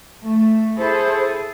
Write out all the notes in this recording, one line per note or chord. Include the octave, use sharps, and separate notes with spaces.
A3
E4 G#4 A4 C5